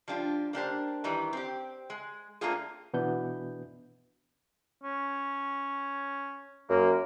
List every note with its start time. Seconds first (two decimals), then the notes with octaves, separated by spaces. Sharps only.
0.08 F3 G3 D4 F4
0.53 A#3 D4 G4 C5
1.04 D#3 E3 G3
1.33 C4 G4
1.90 G#3
2.41 A3 A#3 C4 D4 F4 G#4
2.93 B2 E3 B3 D4 G6
4.83 C#4
6.70 F#2 A#3